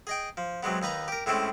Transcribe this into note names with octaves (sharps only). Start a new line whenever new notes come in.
G#4 D#5 G5
F3
C3 F#3 G#3 B3
D#2 D#4 B4 A#5
G4 A#4
A2 G#3 A3 C4 C#4 E4